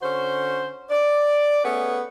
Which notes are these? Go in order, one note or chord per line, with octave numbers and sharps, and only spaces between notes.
D3 C#4 F#4 C5
D5
A3 B3 C#4 G#4 B4 F#5